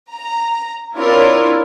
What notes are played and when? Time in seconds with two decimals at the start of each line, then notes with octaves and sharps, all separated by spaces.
0.11 A#5
0.96 C4 D4 E4 F4 A#4 C#5